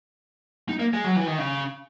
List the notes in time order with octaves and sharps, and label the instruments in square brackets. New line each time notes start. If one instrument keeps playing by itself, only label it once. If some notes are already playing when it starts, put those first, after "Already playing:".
[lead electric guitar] D#4
A#3
G#3
F#3
E3
D#3
C#3